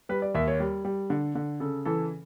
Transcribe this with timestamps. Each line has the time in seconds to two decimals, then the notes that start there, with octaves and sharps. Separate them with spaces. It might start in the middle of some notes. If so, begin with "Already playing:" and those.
0.09 G3 B4
0.22 D5
0.35 D#2 E5
0.48 C#5
0.60 G3
0.85 G3
1.10 D3
1.35 D3
1.60 C#3 A4
1.85 E3 A4